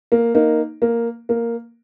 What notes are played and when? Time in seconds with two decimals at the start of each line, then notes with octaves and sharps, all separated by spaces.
0.12 A#3
0.35 A#3 D#4
0.82 A#3
1.29 A#3